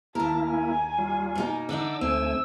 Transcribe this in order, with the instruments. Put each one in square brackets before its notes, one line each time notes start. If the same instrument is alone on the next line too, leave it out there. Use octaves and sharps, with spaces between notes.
[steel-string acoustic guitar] D#2 A#4 [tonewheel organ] A#3 E4 [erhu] A5
[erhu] G#5
[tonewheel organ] G3 F4
[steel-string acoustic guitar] B2 A#3 D#4
[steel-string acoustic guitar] D3 D4 D#4 [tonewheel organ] D6 E6
[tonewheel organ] D2 A3 G#5 [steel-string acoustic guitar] C4 [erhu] E6